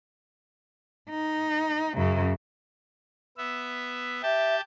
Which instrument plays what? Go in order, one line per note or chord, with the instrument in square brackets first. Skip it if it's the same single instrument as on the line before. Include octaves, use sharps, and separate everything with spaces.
[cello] D#4
F#2 C#3
[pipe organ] B3 E5
[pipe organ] G4 G5 A5 [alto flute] E5